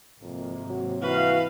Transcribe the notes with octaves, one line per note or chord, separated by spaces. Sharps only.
G#1 F2 C3 A#3
F#3
E3 F#4 B4 F5